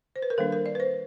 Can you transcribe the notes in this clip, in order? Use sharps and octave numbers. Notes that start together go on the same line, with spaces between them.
C5
B4
A#4
D#3 G3 A#3 D4 A4
A#4
D5
B4
C5